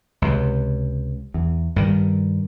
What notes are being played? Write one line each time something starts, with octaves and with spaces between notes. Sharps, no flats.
C#2 C3
E2
G2 D#3 G3